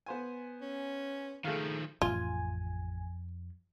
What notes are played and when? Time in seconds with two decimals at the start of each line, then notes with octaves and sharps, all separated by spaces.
0.06 B3 C5 G#5
0.62 C#4
1.45 D#3 F3 A3 G#4 F5
2.02 A1 F2 F4 G#5